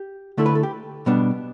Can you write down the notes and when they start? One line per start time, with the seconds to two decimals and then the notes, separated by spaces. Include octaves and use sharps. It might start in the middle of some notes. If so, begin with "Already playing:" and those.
Already playing: G4
0.38 D3 A3 E4 A4
0.46 B4
0.55 A4
0.63 G4
1.06 B2 G3 B3 D4